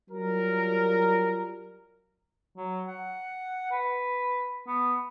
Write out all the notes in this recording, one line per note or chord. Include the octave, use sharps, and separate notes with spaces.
F#3 G3 F4 A#4
F#3
F#5
B4
B3